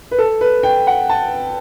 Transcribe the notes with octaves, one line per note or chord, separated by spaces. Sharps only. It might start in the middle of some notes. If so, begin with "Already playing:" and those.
B4
A4
B4
G5
F#5
A5